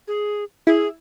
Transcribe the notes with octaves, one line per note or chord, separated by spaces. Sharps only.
G#4
E4 G#4